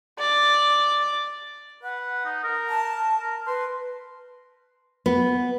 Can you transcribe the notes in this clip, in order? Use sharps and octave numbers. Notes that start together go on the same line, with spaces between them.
D5
B4 F#5
D#4
A#4
A5
A#4
B4 C6
B3